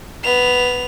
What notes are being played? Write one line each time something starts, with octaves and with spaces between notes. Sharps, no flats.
B3 F7